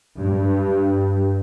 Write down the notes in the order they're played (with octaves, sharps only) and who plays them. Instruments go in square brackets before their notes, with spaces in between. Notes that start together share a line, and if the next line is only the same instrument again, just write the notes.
[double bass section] G2